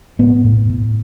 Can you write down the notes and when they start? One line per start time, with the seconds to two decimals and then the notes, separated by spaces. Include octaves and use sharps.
0.19 A2 B3
0.44 A2
0.70 A2